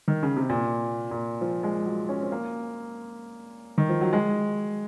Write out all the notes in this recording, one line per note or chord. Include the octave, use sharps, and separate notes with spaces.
D#3
C#3
C3
A#2
A#2
F3
G#3
F#3
C#4
C4
A#3
D#3
F3
F#3
G#3